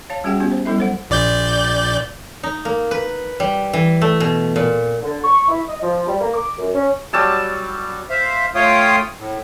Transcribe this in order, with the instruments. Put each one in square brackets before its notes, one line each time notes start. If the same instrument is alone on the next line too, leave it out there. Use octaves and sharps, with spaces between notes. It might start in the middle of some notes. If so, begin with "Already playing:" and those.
[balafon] C#5 F5 A5
G3 C#4 F#4 G#4 F#5 G5
B3 C#4 F4 G4
C5
F#3 G3 B3 E4 A4 E5
A4 C5 F#5
[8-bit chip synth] A#1 D5 G6
[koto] D#4
A#3
B4
G3
E3
A3
B2
A#2
[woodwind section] D3
C#6
E4
D#5
F3
G3
A#3
D6
F#2
C#4
[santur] F#3 G3 A5 E6
[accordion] C5 E5 F5
A3 F4 C#5 F5 G5 D#6
A2